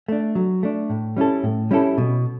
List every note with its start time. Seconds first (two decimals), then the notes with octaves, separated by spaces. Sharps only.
0.08 A3 D4
0.35 F#3
0.63 A3 D4
0.90 A2
1.16 G3 C#4 E4 A4
1.43 A2
1.71 G3 C#4 E4 A4
1.98 B2